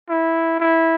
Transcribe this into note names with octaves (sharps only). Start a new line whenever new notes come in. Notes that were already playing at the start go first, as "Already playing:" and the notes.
E4
E4